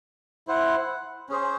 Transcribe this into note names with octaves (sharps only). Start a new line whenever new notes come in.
E4 C5 F#5
C#4 G#4 C5